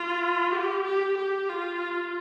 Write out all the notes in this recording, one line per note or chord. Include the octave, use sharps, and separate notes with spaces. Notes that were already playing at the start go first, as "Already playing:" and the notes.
Already playing: F4
G4
G4
G4
F4